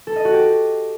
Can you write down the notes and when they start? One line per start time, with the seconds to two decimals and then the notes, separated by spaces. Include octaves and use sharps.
0.07 A4
0.16 D#5
0.25 F#4
0.34 G4